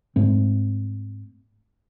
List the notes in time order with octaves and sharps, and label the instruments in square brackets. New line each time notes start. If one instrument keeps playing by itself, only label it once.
[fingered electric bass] G#2 A3 C4